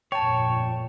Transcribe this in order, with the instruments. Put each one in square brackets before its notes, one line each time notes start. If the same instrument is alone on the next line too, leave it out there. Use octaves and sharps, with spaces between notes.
[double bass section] G1 F2 A#2 [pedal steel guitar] C#5 [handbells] G5 A5